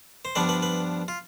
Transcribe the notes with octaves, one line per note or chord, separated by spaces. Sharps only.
C5
G2 F3 B3 D4 B4
B4
B4
F4